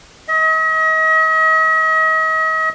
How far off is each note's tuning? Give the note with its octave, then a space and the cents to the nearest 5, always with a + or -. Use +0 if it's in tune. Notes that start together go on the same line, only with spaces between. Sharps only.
D#5 +40